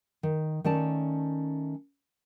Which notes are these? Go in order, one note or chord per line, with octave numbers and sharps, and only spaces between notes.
D#3
D#3 A3 C#4 D5 A5